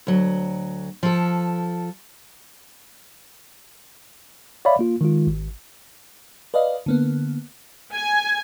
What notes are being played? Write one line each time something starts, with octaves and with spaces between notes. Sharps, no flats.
D2 F#3
F3 A4
C#5 D5 E5 F5 B5
A#3 F4
D#3 G#3 F4
G#1
B4 D5 D#5 F5
D3 A#3 B3
G#5